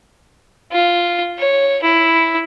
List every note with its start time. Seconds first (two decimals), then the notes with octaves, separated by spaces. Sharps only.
0.72 F4
1.38 C#5
1.83 E4